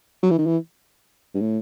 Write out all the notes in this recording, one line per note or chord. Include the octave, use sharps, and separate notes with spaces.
F#3
E3
D#3
E3
G2
A2